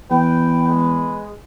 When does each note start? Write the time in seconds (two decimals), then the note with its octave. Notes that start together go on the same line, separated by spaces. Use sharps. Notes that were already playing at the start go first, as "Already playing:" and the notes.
0.11 E2 B4 G5
0.68 G#3